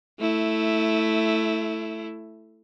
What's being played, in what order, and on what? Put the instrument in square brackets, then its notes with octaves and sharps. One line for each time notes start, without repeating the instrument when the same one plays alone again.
[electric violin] A3 E4